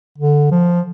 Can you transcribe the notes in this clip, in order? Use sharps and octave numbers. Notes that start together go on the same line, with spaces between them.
D3
F3